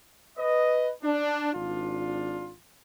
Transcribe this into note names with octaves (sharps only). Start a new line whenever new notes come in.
B4 D#5
D4
G#1 D4 F4